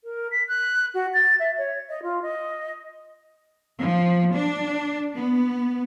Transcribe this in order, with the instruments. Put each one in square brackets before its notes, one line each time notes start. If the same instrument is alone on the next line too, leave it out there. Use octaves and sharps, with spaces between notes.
[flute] A#4
B6
F#6
F#4
A6
E5
C#5
D#5
F4
D#5
[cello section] F3
D4
B3